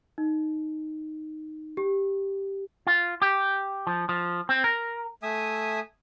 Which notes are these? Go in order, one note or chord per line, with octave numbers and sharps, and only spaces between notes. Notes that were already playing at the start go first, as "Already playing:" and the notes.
D#4
G4
F4
G4
F3
F3
C4
A#4
A3 E5 G#5 D#6